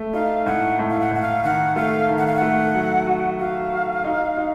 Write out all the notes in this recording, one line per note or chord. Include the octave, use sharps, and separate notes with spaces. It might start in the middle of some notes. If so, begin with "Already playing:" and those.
Already playing: A3
D#4 F5
A2 F#5
A2
F5
F#5
A2 F#5
F5
D#3 F#5
A3 F5
D#3
F#5
F5
F#5
A3
F#3
F#4
F#4 F5
F#4
D#4
D#4